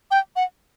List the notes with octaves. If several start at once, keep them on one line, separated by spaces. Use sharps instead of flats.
G5
F#5